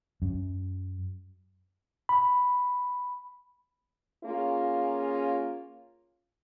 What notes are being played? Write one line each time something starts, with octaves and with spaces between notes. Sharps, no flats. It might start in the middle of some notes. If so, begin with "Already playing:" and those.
F#2
B5
A#3 C#4 F4 G#4